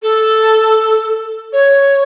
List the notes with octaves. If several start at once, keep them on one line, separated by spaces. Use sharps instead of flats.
A4
C#5